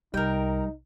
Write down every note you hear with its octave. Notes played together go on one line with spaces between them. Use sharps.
C2 G3 D#4 A#4 G5